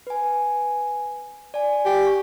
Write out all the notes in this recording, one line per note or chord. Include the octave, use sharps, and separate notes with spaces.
B4 G#5
D5 G#5
G4
C#6